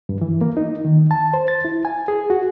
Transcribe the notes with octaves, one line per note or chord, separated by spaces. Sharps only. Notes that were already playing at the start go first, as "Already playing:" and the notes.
G2
E3
A#3
D#4
D#3
A5
C5
A6
E4
G#5
G#4
F#4